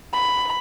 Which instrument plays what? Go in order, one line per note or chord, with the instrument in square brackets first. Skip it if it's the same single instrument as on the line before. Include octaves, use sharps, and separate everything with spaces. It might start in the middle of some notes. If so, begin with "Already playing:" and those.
[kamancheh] B5